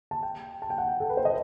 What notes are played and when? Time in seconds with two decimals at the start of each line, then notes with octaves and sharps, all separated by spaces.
0.11 A5
0.23 G5
0.62 A5
0.70 G5
0.78 F#5
1.00 A4
1.10 B4
1.17 C5
1.25 D#5